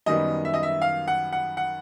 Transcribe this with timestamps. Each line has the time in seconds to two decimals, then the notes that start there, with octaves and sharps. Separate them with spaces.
0.06 F#2 D#3 G3 B3 D#5
0.45 E5
0.54 D#5
0.63 E5
0.82 F5
1.08 F#5
1.32 F#5
1.57 F#5